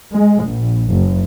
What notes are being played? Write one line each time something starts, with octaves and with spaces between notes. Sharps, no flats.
G#3
A#1
F#1